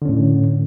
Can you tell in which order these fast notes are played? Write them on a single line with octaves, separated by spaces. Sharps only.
D3 C#4 A2